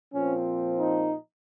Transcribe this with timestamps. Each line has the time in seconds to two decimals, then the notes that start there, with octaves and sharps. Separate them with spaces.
0.14 A#2 F3 C4 C#4
0.76 D#4